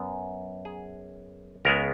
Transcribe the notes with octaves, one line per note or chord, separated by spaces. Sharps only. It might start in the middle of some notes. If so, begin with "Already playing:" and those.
Already playing: F#2 B3
G#4
C#2 C#3 G#3 B3 A#4